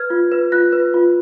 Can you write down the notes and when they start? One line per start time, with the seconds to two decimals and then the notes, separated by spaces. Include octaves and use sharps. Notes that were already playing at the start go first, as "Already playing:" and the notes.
Already playing: B4 F6 G#6
0.10 F4
0.32 B4
0.52 F4 F#6 A#6
0.73 B4
0.94 F4